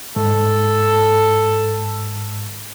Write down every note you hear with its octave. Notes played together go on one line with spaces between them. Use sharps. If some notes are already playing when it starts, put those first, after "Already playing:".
G#2 A4